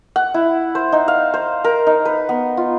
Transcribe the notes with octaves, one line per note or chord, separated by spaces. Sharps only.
F#5
E4
C5
D#4
F5
C5
A#4
D#4
B4
B3
F4